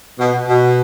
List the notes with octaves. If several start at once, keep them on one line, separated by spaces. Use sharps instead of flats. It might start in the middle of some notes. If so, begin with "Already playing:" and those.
B2
B2